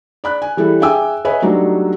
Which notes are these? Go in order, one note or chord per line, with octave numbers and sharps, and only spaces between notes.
D5 B5 F#6
G#5
E3 G3 E4 A4
G#4 E5 G5 G#5 D6 E6
B4 C#5 D#5 E5 G#5 B5
F#3 G3 A3 D4 D#4 F#4